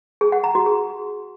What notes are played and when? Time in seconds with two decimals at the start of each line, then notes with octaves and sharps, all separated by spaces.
0.21 G#4
0.32 F#5
0.44 A#5
0.55 F#4
0.66 G#4